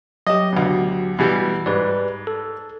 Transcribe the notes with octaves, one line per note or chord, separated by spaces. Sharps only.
F#3 G4 D#5
D2 B2
B2 E3 G3
G#2 G3 B4 D5
A4